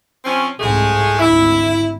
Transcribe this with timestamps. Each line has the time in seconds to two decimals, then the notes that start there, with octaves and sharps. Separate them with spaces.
0.25 F3 C4 C#4
0.59 C2 G#2 G#3 A3 G#4
1.18 G#1 D2 E4